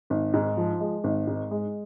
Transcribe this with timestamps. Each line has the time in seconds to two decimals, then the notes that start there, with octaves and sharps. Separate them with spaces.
0.10 G#1
0.34 G#2
0.57 F3
0.80 G#3
1.04 G#1
1.27 G#2
1.51 G#3